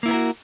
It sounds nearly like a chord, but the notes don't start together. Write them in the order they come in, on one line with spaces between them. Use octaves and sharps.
A#3 E4 B3 A#4 F#4